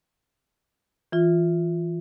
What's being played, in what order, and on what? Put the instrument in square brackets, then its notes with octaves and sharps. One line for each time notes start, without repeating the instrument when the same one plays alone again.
[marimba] E3 F4